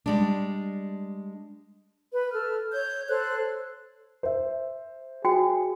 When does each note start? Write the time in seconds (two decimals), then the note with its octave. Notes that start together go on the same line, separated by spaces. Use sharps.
0.06 G3 G#3 D4
2.12 B4
2.32 A4 F6
2.73 C#5 G6
3.08 A4 C5 C#5 F#6
4.23 C5 E5
5.25 F#4 G#4 G5